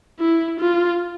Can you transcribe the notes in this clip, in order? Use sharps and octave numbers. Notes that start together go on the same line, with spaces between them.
E4
F4